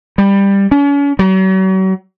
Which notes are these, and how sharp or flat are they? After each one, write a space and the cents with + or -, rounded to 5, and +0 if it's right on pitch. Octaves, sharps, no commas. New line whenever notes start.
G3 +15
C#4 +40
F#3 +40